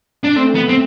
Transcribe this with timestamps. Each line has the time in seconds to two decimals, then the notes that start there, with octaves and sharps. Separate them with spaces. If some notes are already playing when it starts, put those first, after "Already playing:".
0.24 D4
0.35 A3 C4
0.55 B3
0.69 C4